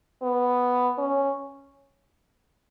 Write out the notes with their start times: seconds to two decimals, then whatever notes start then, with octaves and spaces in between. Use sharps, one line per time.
0.22 B3
0.98 C#4